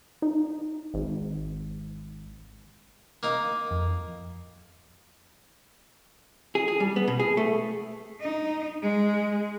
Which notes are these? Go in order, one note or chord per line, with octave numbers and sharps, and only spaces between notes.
D#4
G#1
A#3 D#4 F5
F2
G#4
G#4
G3
B3
B2
G#4
A3
D#4
G#3